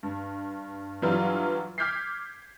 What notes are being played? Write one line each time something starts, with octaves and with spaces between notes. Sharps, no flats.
G2
G2 E3 F#3 G3 F4
D6 F6 G6 G#6 B6 C7